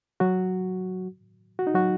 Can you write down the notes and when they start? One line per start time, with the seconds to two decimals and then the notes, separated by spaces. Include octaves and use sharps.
0.20 F#3 F#4
1.59 F#4
1.67 D#4
1.74 F#3 F#4